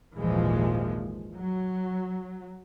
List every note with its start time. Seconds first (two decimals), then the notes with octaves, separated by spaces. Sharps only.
0.16 G#1 D#2 A#2 E3 F3 G#3
1.35 F#3